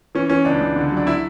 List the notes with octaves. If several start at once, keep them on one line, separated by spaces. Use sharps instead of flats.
E3 C#4
E3 C#4
C#2 D4
C#2
D3
F#3
D4
E4